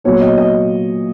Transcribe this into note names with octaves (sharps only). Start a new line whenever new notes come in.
A#2 F#3 B3 C#5
D#5
D#5